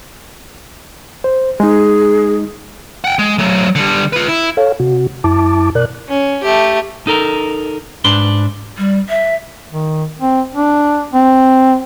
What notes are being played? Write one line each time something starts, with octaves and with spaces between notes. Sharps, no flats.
C5
G#3 D#4 G#4
F#5 G5
G#3
F#3 A3
D3 G3
F4 B4
E4
A4 C#5 F5
C3 F#4
F#2 E4 A5 D6
B2 A#4 D5 F#6
C#4
A3 G4
D#4 A4 A#4
G#2 D4 B4 C6
G3
E5
D#3
C4
D4
C4